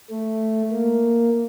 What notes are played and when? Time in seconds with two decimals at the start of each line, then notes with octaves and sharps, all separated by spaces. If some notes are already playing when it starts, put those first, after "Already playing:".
0.10 A3
0.72 A#3